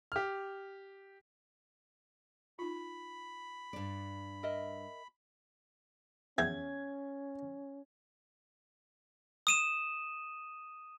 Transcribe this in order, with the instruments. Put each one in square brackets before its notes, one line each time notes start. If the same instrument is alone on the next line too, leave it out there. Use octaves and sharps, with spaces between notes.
[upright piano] G4 F6
[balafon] D#4 F4 [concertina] B5
[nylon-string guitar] G2 D5
[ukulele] A#4 D#5 E5
[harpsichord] E2 E5 G5 [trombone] C#4 [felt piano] G#6
[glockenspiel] D#6 D#7 E7